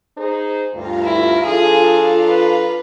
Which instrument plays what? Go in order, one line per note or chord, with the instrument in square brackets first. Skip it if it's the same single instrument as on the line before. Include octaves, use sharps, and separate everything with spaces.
[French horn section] D#4 G#4 C5
[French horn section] D2 G2 [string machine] F4 F5 A#5
[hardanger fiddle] E4
[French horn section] F3 D4 A4 [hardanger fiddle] G#4
[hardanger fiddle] B4